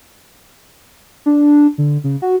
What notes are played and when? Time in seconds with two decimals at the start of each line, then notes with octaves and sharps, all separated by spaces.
1.26 D4
1.78 D3
2.04 C#3
2.22 F#4